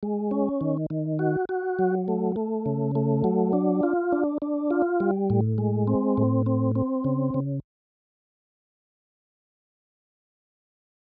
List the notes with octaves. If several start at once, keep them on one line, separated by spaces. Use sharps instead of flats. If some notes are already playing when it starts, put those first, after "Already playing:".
G#3
C#4
D#3
D#3
F#4
F#4
F#3
A3
A3
C#3
A3
F#3
D4
F4
D4
D4
F4
G3
A2
G#3
C4
A2
C4
C4
C#3
C#3